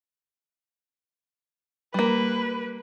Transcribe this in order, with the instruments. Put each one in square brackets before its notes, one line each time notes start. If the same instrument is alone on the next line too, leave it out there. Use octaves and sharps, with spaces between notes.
[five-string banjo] G3 A#3 [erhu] B4